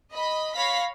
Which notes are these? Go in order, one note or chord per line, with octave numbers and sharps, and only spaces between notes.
D#5 B5
C#5 F5 B5 A#6 B6